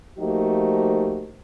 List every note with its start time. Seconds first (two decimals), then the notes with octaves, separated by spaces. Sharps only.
0.19 F3 A3 A#3 D#4 F#4 G4